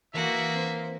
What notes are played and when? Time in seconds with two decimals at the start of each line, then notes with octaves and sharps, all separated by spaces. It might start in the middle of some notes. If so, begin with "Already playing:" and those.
0.14 E3 A#3 F#4 E5 F#5
0.54 C4 C5